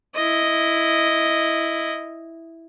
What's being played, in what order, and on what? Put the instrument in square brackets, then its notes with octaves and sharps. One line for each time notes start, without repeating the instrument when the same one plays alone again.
[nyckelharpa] E4 D#5